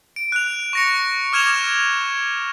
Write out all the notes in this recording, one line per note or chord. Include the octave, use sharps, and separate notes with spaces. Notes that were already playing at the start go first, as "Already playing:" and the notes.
D7
F#6 F7
C#6 A#6 C#7
D6 F6 G#6 E7 F7 G7